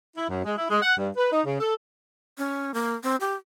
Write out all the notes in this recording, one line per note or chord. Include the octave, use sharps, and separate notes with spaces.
E4
F#2
G#3
E4
G#3
F#5
G2
B4
D#4
C#3
A4
C#4
A#3
C4
G4